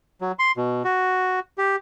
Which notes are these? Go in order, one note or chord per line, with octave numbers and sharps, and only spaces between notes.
F#3
C6
B2
F#4
G4